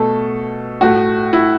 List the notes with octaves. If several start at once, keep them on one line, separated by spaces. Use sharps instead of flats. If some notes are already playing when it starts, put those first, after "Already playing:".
Already playing: B2 A3 A4
A2 A3 F#4
E4